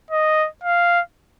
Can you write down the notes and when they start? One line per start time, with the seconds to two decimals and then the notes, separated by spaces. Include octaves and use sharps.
0.11 D#5
0.64 F5